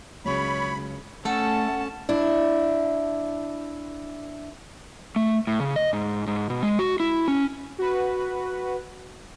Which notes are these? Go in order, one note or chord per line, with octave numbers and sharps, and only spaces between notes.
C#2 C#3 F#3 C#5 B5
A3 C#4 A4 F#5 A5
D4 E4
A3
A2
C#3
D#5
G#2
G#2
B2
G#3
F#4
E4
C#4
F#4 B4